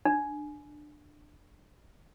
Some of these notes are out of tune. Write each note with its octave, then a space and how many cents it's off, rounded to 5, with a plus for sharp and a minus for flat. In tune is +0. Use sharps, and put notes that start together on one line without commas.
D4 +20